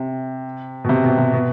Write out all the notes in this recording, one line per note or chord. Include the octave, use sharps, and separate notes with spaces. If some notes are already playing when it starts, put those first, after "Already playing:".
Already playing: C3
B2
C3
B2
C3
B2